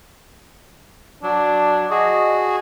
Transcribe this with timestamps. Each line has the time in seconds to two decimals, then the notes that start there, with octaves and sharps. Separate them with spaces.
1.23 F#3 D4
1.91 F#4 G#4 D#5